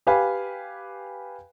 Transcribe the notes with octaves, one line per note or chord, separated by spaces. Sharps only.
G4 B4 F5 G#5 B5